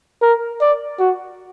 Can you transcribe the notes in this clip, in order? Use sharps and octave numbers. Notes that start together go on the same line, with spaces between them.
A#4
D5
F#4